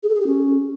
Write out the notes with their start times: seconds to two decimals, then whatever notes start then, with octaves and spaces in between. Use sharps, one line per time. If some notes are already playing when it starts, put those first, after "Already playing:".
0.03 G#4
0.09 A4
0.15 G#4
0.21 G4
0.27 C#4